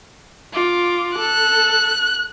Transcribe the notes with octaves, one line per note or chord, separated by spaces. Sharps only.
F4 D6
A4 F#6